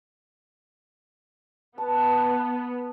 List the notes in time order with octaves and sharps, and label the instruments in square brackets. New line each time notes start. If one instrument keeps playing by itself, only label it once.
[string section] B3 [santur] A5